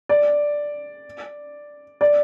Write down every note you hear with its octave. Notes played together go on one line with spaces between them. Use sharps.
D5
D5